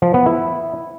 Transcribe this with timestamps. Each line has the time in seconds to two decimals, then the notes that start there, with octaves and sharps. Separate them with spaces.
0.02 F3
0.14 B3
0.26 E4